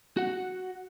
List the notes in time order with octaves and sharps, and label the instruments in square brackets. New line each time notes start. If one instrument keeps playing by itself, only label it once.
[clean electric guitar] F#4 F#5